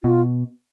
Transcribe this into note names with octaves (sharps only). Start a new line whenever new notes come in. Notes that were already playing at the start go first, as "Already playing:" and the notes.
B2 F4